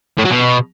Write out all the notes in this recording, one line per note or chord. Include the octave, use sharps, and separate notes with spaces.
A2
F#3
B2